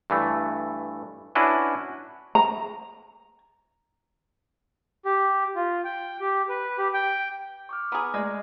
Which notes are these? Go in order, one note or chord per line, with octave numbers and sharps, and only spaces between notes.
G2 E3 A3
C#4 D4 E4 F#4 B4
A#5
G4
F4
G5
G4
B4
G4
G5
C#6 D6 F6
B3 G#4 A#5
G#3 A3 D5